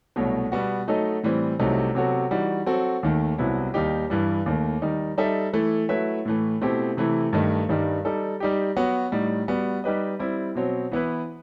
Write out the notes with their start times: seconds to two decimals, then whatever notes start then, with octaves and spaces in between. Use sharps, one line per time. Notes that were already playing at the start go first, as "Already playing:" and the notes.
0.16 C2 B2 F#3 A3
0.52 B2 G3 B3 F#4
0.88 F#3 A3 D#4 A4 D#5
1.23 A2 E3 G3 C4
1.59 C2 C3 F#3 A3 D#4
1.95 C3 F#3 B3 F#4 A4
2.31 E3 G3 D#4 F#4
2.66 F#3 C4 F#4 A4
3.03 D#2 D#3 A3
3.38 C2 C3 F#3 B3 E4
3.74 D#2 D#3 G3 D#4 G4
4.10 G2 E3 G3
4.46 D#2 D#3 A3
4.82 D#3 G3 D#4
5.18 G3 D#4 A4 E5
5.53 E3 A3 E4 A4
5.89 F#3 A3 E4 B4 E5
6.25 A2 E3 A3
6.61 B2 A3 C4 E4 G4
6.97 C3 E3 A3 E4
7.33 G2 D#3 A3 D#4
7.69 G2 D#3 G3 D#4
8.05 G3 D#4 A4
8.40 G3 D#4 G4
8.77 F#3 B3 F#4
9.12 A2 G3 D#4
9.48 G3 B3 F#4
9.84 G3 D#4 G4 B4 D#5
10.19 G3 C4 E4
10.55 B2 F#3 C4
10.92 E3 B3 E4 B4